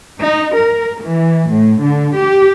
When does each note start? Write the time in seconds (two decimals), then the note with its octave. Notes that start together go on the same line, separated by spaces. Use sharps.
0.21 D#4
0.55 A#4
1.02 E3
1.51 A2
1.82 D3
2.16 G4